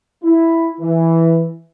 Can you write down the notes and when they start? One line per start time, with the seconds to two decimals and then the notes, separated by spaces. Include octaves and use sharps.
0.23 E4
0.81 E3